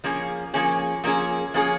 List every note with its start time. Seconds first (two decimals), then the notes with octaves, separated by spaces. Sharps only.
0.04 F3 A#3 C#4 G#4
0.54 F3 A#3 C#4 G#4
1.04 F3 A#3 C#4 G#4
1.54 F3 A#3 C#4 G#4